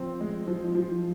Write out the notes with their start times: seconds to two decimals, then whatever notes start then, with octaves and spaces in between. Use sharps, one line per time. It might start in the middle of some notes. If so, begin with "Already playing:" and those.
Already playing: F3 C4
0.20 G#3
0.47 F3
0.75 F3